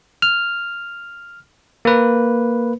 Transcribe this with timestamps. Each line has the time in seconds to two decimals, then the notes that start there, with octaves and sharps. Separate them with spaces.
0.22 F6
1.85 A#3 B4